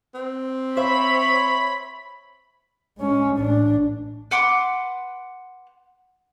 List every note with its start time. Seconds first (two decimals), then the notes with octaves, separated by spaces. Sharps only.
0.15 C4
0.77 C5 C#5 E5 B5
2.99 G#3 C#4
3.38 A1 D4
4.31 B4 F#5 C6 D6